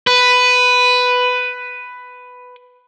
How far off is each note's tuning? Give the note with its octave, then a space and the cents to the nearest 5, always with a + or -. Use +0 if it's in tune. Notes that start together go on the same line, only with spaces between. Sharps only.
B4 +10